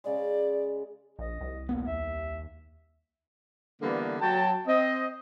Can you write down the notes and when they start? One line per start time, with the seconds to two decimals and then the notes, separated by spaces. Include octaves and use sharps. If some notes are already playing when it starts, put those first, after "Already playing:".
0.04 C#3 G#3 D5
1.19 A#1 D#5
1.41 C2
1.69 E1 A#3 B3
1.87 D#2 E5
3.81 D3 E3 G3 A#3 B3 D4
4.20 F#3 G5 A5
4.67 C4 D#5